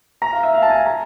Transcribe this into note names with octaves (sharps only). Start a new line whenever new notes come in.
A#5
F5
E5
F5
A5
G#5
A#5